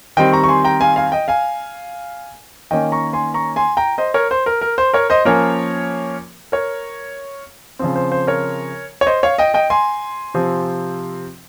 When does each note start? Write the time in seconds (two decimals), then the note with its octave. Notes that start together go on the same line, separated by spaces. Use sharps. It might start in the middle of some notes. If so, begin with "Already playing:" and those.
0.17 D#3 G3 C4 D#5 G5
0.32 A#5 C#6
0.44 C#6
0.49 G#5 C6
0.65 G5 A#5
0.81 F5 G#5
0.96 F5 G#5
1.12 D#5 G5
1.28 F5 G#5
2.71 D#3 A#3 C#4 D#5 G5
2.92 A#5 C#6
3.13 G#5 C6
3.34 A#5 C#6
3.56 G#5 C6
3.77 G5 A#5
3.98 C5 D#5
4.14 A#4 C#5
4.31 C5
4.46 A#4
4.61 A#4
4.78 C5
4.93 A#4 C#5
5.10 C5 D#5
5.25 F3 A#3 C#4 A#4 C#5
6.52 A#4 C#5
7.79 C#3 F3 C4 C5
7.96 C5
8.12 C5
8.27 A#4 C#5
9.01 C#5
9.06 C5 D#5
9.23 C#5 F5
9.38 D#5 G5
9.54 D#5 G5
9.70 G#5 C6
10.34 C3 F3 C4